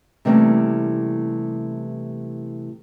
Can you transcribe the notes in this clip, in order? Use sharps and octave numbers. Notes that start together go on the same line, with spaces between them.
C3 E3 G3 A3 A#3 C#4